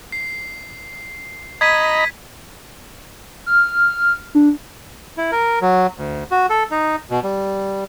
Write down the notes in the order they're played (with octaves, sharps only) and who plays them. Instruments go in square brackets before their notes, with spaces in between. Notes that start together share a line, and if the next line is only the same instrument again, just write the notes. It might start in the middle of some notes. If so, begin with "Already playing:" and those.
[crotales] C7
[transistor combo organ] D#5 A#5 B5 [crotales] G#6 B6 D#7
[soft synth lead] F6
D4
[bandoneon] E4
A#4
F#3
D2
F#4
A4
D#4
B2
G3